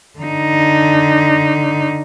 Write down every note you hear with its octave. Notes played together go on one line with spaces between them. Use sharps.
D3 D#4